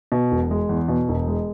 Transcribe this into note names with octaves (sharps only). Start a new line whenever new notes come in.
B2
E1
G#3
E2
B2
E1
G#3